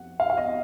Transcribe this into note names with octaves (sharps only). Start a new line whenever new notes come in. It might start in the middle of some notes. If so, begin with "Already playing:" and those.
Already playing: F2 F#5
F5
F5
D#5